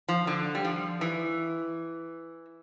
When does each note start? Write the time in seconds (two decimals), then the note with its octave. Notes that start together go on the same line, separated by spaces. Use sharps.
0.09 F3
0.27 D3
0.55 G3
0.65 F3
1.01 E3